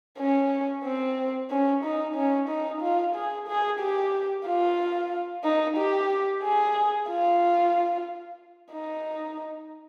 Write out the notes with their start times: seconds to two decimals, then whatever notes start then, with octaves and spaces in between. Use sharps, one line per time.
0.19 C#4
0.85 C4
1.50 C#4
1.84 D#4
2.15 C#4
2.49 D#4
2.81 F4
3.15 G#4
3.48 G#4
3.80 G4
4.46 F4
5.44 D#4
5.77 G4
6.43 G#4
7.08 F4
8.72 D#4